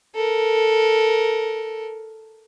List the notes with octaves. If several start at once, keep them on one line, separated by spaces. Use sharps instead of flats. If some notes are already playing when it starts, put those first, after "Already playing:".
A4 A#4